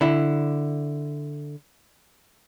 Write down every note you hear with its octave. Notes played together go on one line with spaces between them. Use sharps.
D3 E4